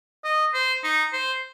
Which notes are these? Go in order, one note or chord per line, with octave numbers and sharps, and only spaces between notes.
D#5
C5
D#4
C5